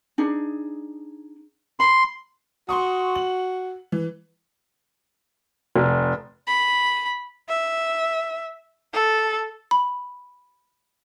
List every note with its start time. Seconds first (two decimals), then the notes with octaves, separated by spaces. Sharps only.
0.18 D4 D#4 G#4
1.80 B5 C6
2.69 F#4 C6 C#6 D#6
3.15 F#7
3.92 E3
5.76 F1
6.47 B5
7.49 E5
8.94 A4
9.71 B5